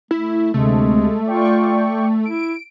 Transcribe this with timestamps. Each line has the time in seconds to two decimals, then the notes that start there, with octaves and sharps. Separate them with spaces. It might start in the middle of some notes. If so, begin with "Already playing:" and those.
0.11 A3 E4
0.54 D2 C3 G#3 A3
1.27 F4 D5 G5 C#6
2.25 E4 D7